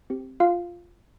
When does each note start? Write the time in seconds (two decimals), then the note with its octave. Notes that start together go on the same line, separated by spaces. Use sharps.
0.10 C4 G4
0.40 F4 F5